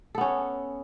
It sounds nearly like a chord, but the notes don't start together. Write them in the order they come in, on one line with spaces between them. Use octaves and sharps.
A4 B3 C#4